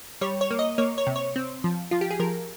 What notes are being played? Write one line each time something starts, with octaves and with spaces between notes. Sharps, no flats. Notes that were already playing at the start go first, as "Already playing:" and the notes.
G3 C#5
C#5
A#3
D#5
A#3 C#5
C#5
C3
C#5
C4
F3
F3 F4
G4
G#4
F3 A#4